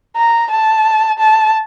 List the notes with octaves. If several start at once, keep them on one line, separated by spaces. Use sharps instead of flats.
A#5
A5
A5